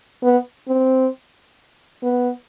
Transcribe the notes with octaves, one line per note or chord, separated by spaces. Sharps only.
B3
C4
B3